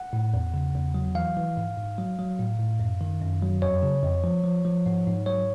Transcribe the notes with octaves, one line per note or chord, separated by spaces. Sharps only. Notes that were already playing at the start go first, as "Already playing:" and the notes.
Already playing: F#5
A2
E2
C#3
E2
F#3
E3 F5
E3
G#2
G#2
F#3
F#3
A2
A2
F#2
D#3
F#2
F#3
F2 C#5
C#3
F2
F3
F3
F3
G#2
G#2
F#3 C#5